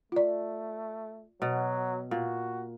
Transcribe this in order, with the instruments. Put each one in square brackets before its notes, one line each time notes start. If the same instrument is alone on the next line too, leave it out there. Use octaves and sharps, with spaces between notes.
[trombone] A3 [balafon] F4 D5
[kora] B2 [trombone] F#3
[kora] A#2 [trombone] F#4